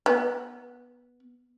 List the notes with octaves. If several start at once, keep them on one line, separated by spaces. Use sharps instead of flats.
B3